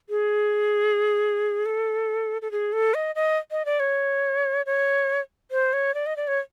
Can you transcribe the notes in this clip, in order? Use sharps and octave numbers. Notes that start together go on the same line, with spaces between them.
G#4
A4
A4
G#4
A4
D#5
D#5
D#5
D5
C#5
C#5
C5
C#5
D5
D#5
D5
C#5